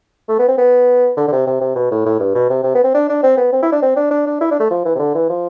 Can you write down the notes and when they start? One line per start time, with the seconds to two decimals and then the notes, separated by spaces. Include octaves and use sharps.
0.29 A3
0.39 B3
0.48 C4
0.58 B3
1.17 D3
1.28 D3
1.32 C3
1.47 C3
1.61 C3
1.75 B2
1.91 A2
2.06 A2
2.20 G2
2.35 B2
2.50 C3
2.64 C3
2.75 B3
2.84 C4
2.94 D4
3.09 D4
3.23 C4
3.37 B3
3.52 C4
3.62 E4
3.72 D4
3.82 C4
3.96 D4
4.11 D4
4.27 D4
4.41 E4
4.51 D4
4.60 A3
4.70 F3
4.85 E3
4.95 C3
4.99 D3
5.15 E3
5.30 F3